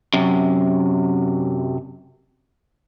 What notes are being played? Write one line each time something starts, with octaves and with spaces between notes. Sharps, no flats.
F#2 C3